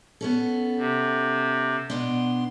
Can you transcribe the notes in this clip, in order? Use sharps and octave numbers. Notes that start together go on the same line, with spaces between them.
B3 C#4 A4
C3
B2 B3 D4 C6